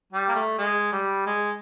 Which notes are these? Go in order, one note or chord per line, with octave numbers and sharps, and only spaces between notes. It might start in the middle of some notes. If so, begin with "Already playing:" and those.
G3
A#3
A3
G#3
G3
G#3